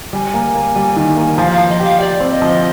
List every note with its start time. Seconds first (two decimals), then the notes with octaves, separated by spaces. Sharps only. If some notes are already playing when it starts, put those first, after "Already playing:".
0.13 G3 G#5
0.34 A#3
0.55 A#3
0.76 G3
0.96 D#3
1.17 A#3
1.37 F3 F5
1.53 F5
1.58 F3
1.69 D#5
1.80 G4 F5
1.99 G4 D5
2.20 C4
2.31 D#5
2.42 F3